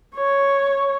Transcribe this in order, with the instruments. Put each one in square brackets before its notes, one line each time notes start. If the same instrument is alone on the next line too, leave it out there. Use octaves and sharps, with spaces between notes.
[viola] C#5